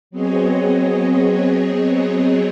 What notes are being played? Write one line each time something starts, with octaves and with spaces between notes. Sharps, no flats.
F#3 B3 C4 G#4 C#5 D#5